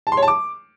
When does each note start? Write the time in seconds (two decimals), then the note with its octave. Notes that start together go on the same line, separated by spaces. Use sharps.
0.07 A5
0.12 C6
0.17 C#5
0.23 A5
0.28 D6